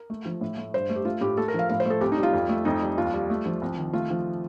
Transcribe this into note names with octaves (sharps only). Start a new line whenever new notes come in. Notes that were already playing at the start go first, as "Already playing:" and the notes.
Already playing: A#4
A3
F3
A2
A3
G2 C5
A3
G4
A3 F4
A2 G4
A3 A4
A#4
F3 F5
A2 F5
C5
A3 A4
C2 G4
D#4
G3
F4
F2
A3
F2 D#4
G3
D#2 F4
G3
A3
F3
C2
D#3
A3 F4
F3